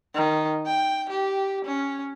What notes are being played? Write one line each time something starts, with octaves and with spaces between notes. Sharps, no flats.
D#3
G5
G4
C#4